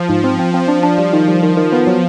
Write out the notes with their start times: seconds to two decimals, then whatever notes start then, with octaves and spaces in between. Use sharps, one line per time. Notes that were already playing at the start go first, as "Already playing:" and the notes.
Already playing: F3
0.09 G#2
0.24 C4
0.39 C4
0.54 C4
0.68 D4
0.83 D4
0.98 G3
1.13 D#3
1.28 G3
1.43 D#3
1.57 D#3
1.72 B3
1.87 F#3